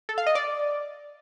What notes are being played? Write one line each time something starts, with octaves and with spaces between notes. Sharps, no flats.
A4
F5
D#5
D5